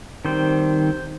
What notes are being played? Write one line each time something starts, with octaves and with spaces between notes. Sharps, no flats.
D#3 G3 C4 C5